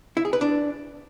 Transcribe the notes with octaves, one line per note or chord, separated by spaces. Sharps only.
E4
G#4
B4
D4